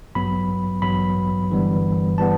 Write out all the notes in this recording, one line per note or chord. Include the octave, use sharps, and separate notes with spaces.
A1 G2 F#3 B3 B5
A1 G2 F#3 B3 B5
G1 G2 E3 G3 B3
E3 G3 B3 A5